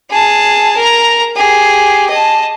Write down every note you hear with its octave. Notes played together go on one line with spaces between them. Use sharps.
G#4 A5
A#4 A#5
G4 G#4
D#5 A5